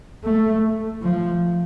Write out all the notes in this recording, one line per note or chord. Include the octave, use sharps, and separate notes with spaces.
A3
F3